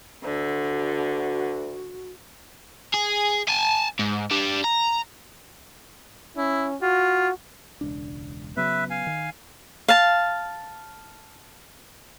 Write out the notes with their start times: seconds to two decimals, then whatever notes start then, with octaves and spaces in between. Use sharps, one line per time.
0.24 D2 D3 F#4
2.94 G#4
3.49 G#5 A5
3.99 G#2
4.31 G3 D4
4.64 A#5
6.37 C#4 E4
6.82 F4 F#4
7.81 E1 C#2 D4
8.57 C#3 F#3 B3 B4 E5
8.90 F5 G#5
9.07 D#3
9.88 F5 A5